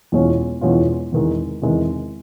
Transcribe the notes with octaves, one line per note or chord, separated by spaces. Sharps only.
E2 B2 G#3 C#4 F4
E2 B2 G#3 C#4 F4
E2 C3 D#3 G#3
E2 C3 D#3 G#3